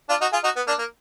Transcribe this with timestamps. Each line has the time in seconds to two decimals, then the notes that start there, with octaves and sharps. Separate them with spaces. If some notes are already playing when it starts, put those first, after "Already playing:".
0.09 D4 F4
0.21 D#4 F#4
0.32 F4 G#4
0.44 D#4 F#4
0.56 B3
0.67 A#3 D4
0.78 A#3